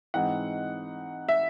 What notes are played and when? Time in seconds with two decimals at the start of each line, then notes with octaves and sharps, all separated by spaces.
0.14 G#2 E3 G#3 C4 D#4 F#5
1.29 E5